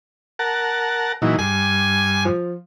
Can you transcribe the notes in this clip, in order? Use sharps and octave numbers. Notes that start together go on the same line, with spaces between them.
A#4 F#5 A5
A#2 E3 F#3 D#4
G2 G#5
F3